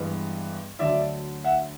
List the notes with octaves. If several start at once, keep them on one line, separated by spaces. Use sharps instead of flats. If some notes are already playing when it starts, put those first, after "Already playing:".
Already playing: G2 E3 G#3 B3
D2 D3 F#3 D5 E5
E5 F#5